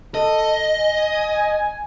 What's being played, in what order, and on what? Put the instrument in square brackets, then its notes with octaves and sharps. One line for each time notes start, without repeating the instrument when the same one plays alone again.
[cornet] A4 [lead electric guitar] D#5
[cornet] G#5